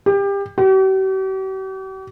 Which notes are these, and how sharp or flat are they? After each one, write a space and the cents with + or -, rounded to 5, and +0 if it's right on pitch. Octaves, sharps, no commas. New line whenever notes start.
G4 +25
G4 -45